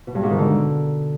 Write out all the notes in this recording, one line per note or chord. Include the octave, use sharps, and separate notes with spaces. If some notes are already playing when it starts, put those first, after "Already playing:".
B2
G2
G#2
D#3
D3